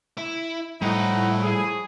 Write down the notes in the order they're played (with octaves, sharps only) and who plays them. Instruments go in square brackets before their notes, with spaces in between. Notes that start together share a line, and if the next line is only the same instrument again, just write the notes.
[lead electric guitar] E4
[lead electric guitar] A2 [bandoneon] F3 A3 E4 [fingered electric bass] G3 [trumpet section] D#4 F#5
[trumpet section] G#4